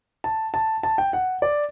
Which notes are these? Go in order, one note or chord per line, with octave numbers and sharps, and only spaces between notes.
A5
A5
A5
G5
F#5
D5